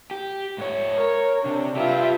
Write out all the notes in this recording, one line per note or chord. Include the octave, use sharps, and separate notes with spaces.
G4
G#2 C#5
A#4 C#5
C3 D4
F4 G4 B4 E5